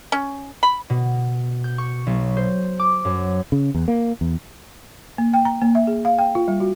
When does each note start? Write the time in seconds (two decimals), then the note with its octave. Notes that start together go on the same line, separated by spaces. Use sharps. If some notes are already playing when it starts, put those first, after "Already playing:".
0.12 C#4
0.63 B5
0.90 B2
1.64 G6
1.78 C#6
2.07 B1
2.37 C5
2.79 D6
3.05 F#2
3.52 C#3
3.75 E2
3.88 A#3
4.21 E2
5.18 A#3
5.34 G5
5.45 A#5
5.62 A#3
5.75 E5
5.87 G#4
6.05 F5
6.18 G5
6.35 F4
6.48 G3
6.60 F#4